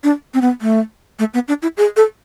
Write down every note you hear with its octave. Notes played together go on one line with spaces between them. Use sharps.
D4
C4
B3
A3
A3
B3
D4
E4
G#4
A4